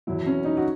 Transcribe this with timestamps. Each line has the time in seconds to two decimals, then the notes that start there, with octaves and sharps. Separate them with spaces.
0.07 E2 B2 F#3 E4
0.26 C#4
0.44 D#4
0.57 F#4